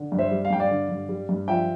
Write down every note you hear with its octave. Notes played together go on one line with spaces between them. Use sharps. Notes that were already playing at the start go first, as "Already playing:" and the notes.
Already playing: D3
G2
C5 E5
G3
F5
G2 G5
D5 F5
D3
G2
G3
G2
F3 E5 G5